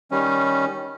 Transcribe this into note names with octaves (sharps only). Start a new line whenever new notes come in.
D#3 G3 C#4